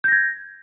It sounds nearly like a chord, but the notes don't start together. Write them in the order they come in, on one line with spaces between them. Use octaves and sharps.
G6 A#6 G#6